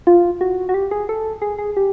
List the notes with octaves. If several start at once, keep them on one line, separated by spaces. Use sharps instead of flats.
F4
F#4
F#4
G4
G#4
A4
G#4
G#4
G4